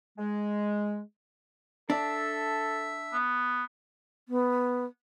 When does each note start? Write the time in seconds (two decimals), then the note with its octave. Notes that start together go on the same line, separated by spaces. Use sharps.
0.18 G#3
1.90 D4 A4 E5
3.13 B3
4.28 B3